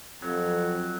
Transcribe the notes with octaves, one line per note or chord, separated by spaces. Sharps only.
F2 F#3